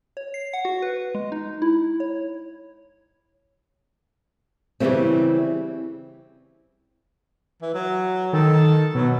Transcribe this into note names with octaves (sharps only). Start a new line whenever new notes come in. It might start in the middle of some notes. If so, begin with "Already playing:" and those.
C#5
C7
F#5
F#4
B4
G#3
D#4
E4
C#5
C#3 E3 F3 G3 A3 C4
E3
F#3
D#3 A4
B2 F#3